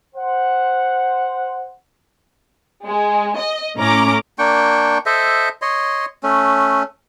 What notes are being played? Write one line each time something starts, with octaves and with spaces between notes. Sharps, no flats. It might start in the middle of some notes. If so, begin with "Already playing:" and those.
C5 F#5
G#3
D#5
A2 C#4 A#5 D6
A#3 D4 G5 C#6
A4 C5 D#5 E5
C#5 D#5 C6
A3 C#4